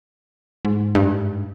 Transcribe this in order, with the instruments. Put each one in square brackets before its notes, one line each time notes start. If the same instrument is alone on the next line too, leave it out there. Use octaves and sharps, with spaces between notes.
[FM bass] G#2
[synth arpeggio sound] G2